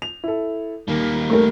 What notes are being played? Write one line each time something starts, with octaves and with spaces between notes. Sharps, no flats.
F7
E4 A4
D#2 G3 A#3
A3 A#4